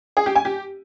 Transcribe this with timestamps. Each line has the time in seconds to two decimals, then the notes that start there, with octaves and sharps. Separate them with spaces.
0.17 G#4
0.26 G4
0.36 G#5
0.45 G4